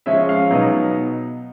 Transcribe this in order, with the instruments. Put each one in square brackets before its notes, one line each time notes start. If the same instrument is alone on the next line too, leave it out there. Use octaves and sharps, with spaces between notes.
[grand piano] F3 G#3 C#4 E5
F5
B2 F#3 B3 D#4